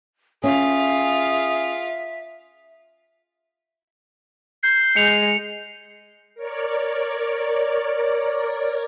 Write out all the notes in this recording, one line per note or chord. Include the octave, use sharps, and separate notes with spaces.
C#4 F4 G#4 E5 F5
G6 C7
G#3 C#7 F7
A#4 C#5 D5